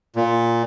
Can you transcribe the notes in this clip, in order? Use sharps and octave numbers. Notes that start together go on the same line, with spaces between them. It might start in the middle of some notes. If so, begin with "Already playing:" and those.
A#2